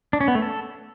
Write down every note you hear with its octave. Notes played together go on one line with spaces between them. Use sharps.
D4
C#4
B3
A3
A4